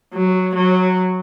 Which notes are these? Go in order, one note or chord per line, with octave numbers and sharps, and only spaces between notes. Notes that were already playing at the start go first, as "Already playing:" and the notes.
F#3
F#3